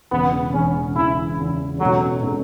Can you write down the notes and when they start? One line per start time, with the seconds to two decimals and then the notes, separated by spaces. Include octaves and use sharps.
0.11 E1 E2 C#3 E3 B3
0.53 E1 E2 C#3 E3 C#4
0.96 E1 E2 C#3 E3 E4
1.38 E1 E2 C#3 E3
1.80 B2 F#3 G#3 C#4 F#4 A4
2.23 B2 G#3 C#4 F#4 A4